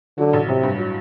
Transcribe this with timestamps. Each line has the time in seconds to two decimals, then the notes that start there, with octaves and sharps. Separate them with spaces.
0.18 D3 F#3
0.33 A1
0.48 A1 C3
0.63 G2
0.78 F#3